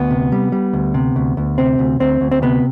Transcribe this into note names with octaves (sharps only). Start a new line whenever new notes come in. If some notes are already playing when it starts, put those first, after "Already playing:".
Already playing: D2 B3
C3
G3
G3
D2
C3
D2
D2
C3 C4
D2
D2 C4
D2
C4
C3 B3